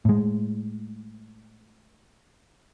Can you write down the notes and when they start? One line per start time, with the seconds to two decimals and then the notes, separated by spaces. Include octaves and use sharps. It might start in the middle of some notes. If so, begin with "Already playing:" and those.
0.05 A2 G#3